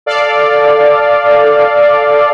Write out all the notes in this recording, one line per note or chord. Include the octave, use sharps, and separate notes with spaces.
A4 D5 F5